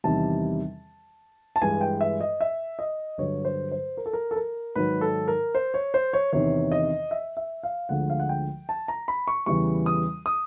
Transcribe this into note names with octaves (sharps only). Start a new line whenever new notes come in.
E2 C3 D#3 G3 A5
A5
G2 E3 G#3 G#5
G5
E5
D#5
E5
D#5
G2 D3 F#3 C#5
C5
C5
A#4
A4
A#4
A4
A#4
G#2 D#3 F#3 B4
A4
A#4
C5
C#5
C5
C#5
E2 C3 D#3 C#5
D#5
E5
E5
F5
D2 D3 F3 G#3 F#5
F5
F#5
G5
A5
A#5
B5
C#6
E2 C#3 E3 G3 C#6
D#6
D#6